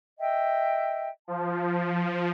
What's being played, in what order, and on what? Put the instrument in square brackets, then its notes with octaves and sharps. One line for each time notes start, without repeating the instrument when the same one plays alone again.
[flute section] D#5 E5 G5
[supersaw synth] F3 [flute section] A5